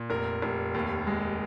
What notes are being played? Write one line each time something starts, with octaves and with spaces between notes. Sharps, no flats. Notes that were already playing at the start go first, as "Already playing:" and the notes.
Already playing: A#2
F1 A#4
F1
D#2
G#3